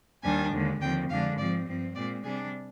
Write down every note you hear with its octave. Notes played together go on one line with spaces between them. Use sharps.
D#2 D#3 G3 D4 G#5
D#2 D3 G#3
D#2 D3 F3 C4 G5
F2 D3 G#3 D4 F5
G#2 F3 C4 D5
G2 F3 C4
A#2 G#3 C4 D5
C3 G3 D4 G#4